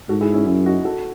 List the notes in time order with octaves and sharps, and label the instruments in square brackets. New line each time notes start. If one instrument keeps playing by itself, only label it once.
[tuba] G#2 [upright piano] F#4 A4
[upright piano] E4 G#4
C#4 E4
[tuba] F#2 [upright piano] C#4 E4
[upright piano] D#4 F#4
F#4 A4